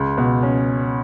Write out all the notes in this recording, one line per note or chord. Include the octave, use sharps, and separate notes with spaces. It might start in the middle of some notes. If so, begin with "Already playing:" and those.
Already playing: C#2
B2
C#4